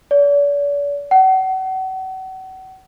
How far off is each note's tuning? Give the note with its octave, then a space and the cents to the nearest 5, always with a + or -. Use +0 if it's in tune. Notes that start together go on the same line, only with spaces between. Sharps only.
D5 -45
F#5 +35